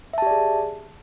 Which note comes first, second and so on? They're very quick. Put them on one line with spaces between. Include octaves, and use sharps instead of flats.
E5 A5 G4 D5 G#4